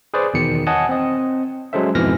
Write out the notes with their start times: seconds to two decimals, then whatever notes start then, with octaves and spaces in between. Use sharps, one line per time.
0.14 G#4 B4 C5 D5
0.34 E2 B2 D#3 C#7
0.67 C#5 D#5 F#5 G#5 A5
0.89 C4 D#5
1.73 F#3 G#3 C#4 A4 C5 E5
1.95 F2 G#2 B2 E3 F6 A#6